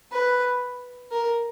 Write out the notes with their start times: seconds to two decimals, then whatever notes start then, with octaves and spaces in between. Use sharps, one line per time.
0.12 B4
1.11 A#4